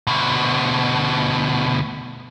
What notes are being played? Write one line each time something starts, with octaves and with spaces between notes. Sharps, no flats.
D2 B2